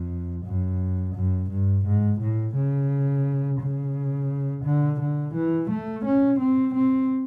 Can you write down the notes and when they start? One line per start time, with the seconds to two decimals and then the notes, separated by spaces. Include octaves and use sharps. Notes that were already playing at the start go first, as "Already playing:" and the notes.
Already playing: F2
0.46 F#2
1.15 F#2
1.50 G2
1.86 G#2
2.21 A2
2.55 C#3
3.60 C#3
4.64 D3
5.00 D3
5.35 E3
5.70 A3
6.05 C#4
6.40 C4
6.74 C4